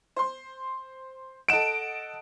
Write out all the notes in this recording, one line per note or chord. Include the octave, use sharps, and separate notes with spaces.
C5 C6
A4 D#5 F#5 D7 E7